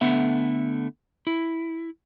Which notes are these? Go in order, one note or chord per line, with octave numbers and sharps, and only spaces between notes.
D3 A3 B3 E5
E4